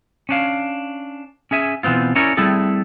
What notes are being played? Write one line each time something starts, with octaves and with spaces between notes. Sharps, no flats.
C#4 D4 F5
C#4 G#4 E5 G#5
B2 E3 B3 C4 F4
C#4 E4 A#4 C#5 D5
G3 A3 C4 E4 G#4 A4